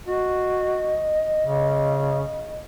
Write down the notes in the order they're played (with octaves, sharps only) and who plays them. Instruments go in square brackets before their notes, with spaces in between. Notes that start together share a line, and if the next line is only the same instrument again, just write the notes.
[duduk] F#4 [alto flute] D#5
[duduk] C#3